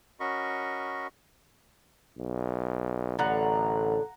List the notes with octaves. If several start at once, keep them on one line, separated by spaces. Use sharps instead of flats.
C#4 F#4 A#4 D#5 B5 C#6
B1
A1 A2 D3 F#5 A#5